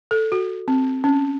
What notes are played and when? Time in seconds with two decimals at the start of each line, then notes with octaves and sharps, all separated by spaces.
0.11 A4
0.32 F#4
0.68 C4
1.04 C#4